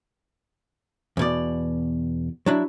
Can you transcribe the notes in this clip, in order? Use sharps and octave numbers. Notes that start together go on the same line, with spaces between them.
E2 B2 D5
F#3 D4 E4